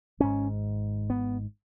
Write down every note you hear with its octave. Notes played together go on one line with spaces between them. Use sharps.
G#1 G#2 C#4
B3